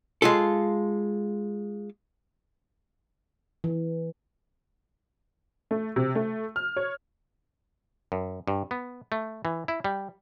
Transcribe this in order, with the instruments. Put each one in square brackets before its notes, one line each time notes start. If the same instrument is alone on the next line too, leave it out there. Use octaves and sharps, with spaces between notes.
[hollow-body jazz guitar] G#3 F4 A4
[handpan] E3
[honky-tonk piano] A3
C3
A3
F6
C#5
[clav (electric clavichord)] F#2
G2
B3
A3
E3
E4
G3